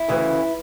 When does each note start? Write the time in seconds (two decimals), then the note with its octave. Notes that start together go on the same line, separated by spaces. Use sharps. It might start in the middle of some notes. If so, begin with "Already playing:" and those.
Already playing: E4
0.08 D2 C#3 E3